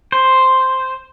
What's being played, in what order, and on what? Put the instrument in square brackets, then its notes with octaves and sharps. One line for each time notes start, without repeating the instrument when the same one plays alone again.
[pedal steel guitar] C5